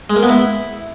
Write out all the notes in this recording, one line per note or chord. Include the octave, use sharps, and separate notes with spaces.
G#3
A#3
B3
E4